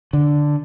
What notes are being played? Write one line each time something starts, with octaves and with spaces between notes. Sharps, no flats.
D3